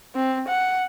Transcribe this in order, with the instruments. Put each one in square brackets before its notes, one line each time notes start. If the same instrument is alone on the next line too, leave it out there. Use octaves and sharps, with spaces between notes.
[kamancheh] C4
F#5